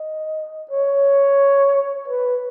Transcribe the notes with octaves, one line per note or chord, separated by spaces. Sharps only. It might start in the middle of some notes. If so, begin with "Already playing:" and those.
Already playing: D#5
C#5
B4